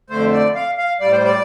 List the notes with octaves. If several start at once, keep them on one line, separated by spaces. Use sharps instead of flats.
F2 D3 A3 C5
D5
F5
F5
A2 G3 D5
C5
D5